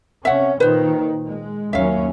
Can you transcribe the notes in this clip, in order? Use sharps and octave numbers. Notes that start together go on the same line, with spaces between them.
C3 C#4 E5 F#5
A#2 D#3 B4 C5
G#3
D#2 F#3 C#4 E5 F5